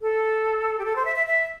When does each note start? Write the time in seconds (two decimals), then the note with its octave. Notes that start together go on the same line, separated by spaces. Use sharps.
0.01 A4
0.79 G4
0.85 A4
0.96 C5
1.05 E5
1.15 E5
1.27 E5